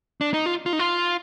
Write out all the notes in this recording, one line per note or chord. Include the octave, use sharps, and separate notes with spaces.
D4
D#4
F4
F4
D#4
F4